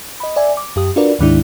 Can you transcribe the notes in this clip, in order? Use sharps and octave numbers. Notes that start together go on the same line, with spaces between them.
D#5 B5
D5 E5 G#5
D6
F#2 G4 D#6
D4 F4 F#4 A#4 B4 D5
D2 G#2 D#3 G#3 D4 E4